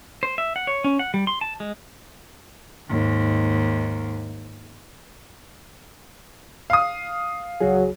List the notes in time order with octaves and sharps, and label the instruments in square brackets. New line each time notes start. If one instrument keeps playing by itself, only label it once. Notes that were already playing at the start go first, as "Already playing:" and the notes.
[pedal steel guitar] C5
E5
F#5
C#5
C#4
F#5
G3
C6
A5
G#3
[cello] D#2 G#2
[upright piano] F5 D#6
[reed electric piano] C#2 F#4 G#4 [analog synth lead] F#3